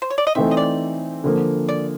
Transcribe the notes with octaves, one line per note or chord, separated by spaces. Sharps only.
C5
C#5
D5
D#5
E3 A3 C4 D#4 E5
D#5
D5
D3 F3 A#3
D5